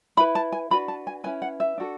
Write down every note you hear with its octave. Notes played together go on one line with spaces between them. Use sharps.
E4 B4 B5
A5
G#5
D4 F#4 B4 B5
A5
G#5
C#4 E4 B4 G#5
F#5
E5
D4 F#4 A4